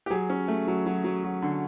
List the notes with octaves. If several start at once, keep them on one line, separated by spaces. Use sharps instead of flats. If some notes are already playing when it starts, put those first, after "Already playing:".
G4
F#3 G#4
C#4
A3
F#3
F#3
F#3
F#3
D3